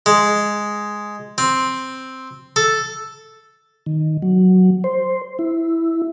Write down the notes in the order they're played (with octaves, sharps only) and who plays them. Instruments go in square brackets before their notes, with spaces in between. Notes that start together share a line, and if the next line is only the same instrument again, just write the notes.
[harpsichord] G#3
C4
A4
[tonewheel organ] D#3
F#3
C5
E4